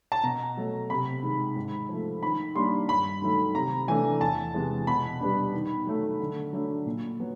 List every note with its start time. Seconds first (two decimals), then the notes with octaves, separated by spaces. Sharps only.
0.12 A5
0.23 B2 A#5
0.57 F#3 A3
0.90 C3 B5
1.23 D#3 G#3
1.56 G#2
1.89 F3
1.94 A3
2.23 D#3 B5
2.55 G3 A#3 D4 C6
2.89 G2 B5
3.22 D#3 F#3 A3
3.55 C3 A#5
3.88 E3 A3 D4 G#5
4.21 E2 A5
4.54 C3 E3 G#3 B3
4.87 B2 B5
5.20 G3 B3 D4
5.54 D#3
5.87 F#3 A3
6.20 D3
6.53 F#3 A3 D4
6.86 A#2
7.20 F#3 B3